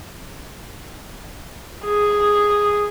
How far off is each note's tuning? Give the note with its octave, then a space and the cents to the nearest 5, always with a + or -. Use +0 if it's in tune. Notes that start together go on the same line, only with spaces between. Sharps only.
G#4 -5